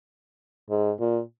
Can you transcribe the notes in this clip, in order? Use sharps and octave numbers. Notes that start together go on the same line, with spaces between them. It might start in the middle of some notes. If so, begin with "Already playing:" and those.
G#2
A#2